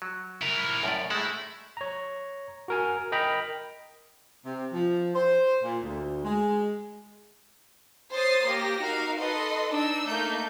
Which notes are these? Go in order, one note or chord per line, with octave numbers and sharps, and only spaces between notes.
F#3
E4 A#4
F#2 A2 D5
G#3 A3 E4
C#5 A#5
F#4 A#4 G#5
A#4 D#5 G5 A#5 B5
C3
F3
C5
A#2
D2
G#3
C5 C#5 C6 D#6 A6 C7
A#3 G4 A#6
D#4 F#4 A#4 F5
A4 B4 D#5 C6
D4 D#4 E6
A3 A#3 D#4 G6